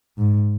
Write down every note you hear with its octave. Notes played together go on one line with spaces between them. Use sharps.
G#2